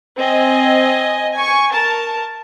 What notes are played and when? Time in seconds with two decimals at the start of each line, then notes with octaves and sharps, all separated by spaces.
0.17 C4 D#5 G#5
1.33 G#5 C#6
1.72 A#4 A5